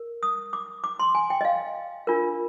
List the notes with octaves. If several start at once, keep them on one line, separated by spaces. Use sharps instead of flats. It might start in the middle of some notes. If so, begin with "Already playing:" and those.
Already playing: A#4
D#6
D6
D6
C6
G#5
G5
D#5
F5
D4 F4 A#4